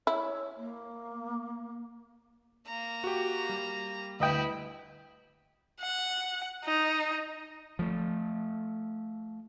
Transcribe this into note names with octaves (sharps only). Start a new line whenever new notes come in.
E4 C#5
A#3
A#3 A#5
F#4 G4
G3
D2 E4 B4 D#5 G5
F#5
D#4
F3 A3